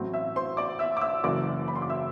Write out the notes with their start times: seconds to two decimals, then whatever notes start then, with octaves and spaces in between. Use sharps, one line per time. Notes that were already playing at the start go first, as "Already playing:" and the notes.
Already playing: A1 A2 F#3 C4
0.13 E5 E6
0.36 C5 C6
0.57 D5 D6
0.79 E5 E6
0.97 D6
1.01 E5 E6
1.24 F#1 F#2 E3 D5 D6
1.68 B5
1.75 C6
1.82 D6
1.89 E5 E6